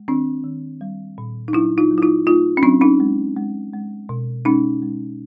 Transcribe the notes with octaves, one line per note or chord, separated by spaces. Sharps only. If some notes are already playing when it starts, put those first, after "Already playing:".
Already playing: G#3
D#3 C4 D4
D#3
G3
A#2
D#4
F#3 D4 E4
D#4 F4
F#3
E4
D#4 F4
A3 D#4 F4
C#4
F#3 C4 D4
C#4 D#4
G#3
G#3
G#3
B2
G#3 C#4 D#4
G#3